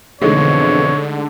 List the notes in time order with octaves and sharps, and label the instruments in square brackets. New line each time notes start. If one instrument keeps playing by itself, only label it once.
[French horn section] F2 B2 E3 [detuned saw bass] D3 [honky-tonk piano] G#3 A3 D#4 [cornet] C#5